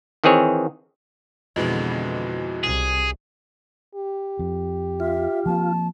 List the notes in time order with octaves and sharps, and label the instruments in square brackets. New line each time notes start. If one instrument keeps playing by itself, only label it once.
[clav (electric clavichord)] D#3 E3 C4 G#4 C#5
[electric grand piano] F2 E3 G#3 [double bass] B2 D3 [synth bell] F#4 D#5
[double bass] C2 [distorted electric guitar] G#4
[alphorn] G4
[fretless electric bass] F2
[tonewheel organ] F4 [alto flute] E5
[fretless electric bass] F3 A#3 C4 [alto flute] A5